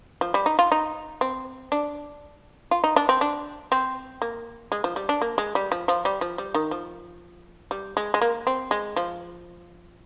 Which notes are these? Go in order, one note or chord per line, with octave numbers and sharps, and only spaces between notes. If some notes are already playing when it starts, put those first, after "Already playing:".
F3
G3
D#4
F4
D#4
C4
D4
F4
D#4
D4
C4
D4
C4
A#3
G#3
F3
G3
D4
A#3
G#3
G3
F3
F3
G3
F3
G3
D#3
F3
G3
G#3
G#3
A#3
C4
G#3
F3